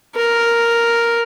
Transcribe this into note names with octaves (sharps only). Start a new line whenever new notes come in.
A#4